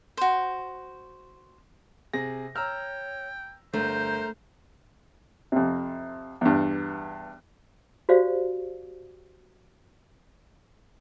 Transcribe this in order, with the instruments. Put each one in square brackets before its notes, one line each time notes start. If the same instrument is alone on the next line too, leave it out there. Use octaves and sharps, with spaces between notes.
[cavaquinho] F#4 C5
[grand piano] C3 G#4 A#6
[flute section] C#5 [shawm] G5 [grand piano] A#5 E6 F6
[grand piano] G1 [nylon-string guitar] A3 [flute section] A#4 A#5 G6 [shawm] C5
[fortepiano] F2 C3
E2 G2
[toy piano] F#4 G4 C5 D5 F5